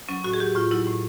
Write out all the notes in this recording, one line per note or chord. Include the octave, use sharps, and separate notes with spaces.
F#3 C#4
A2 F#4
G#4
F#3 G4
A2 F4
F#3 E4
A2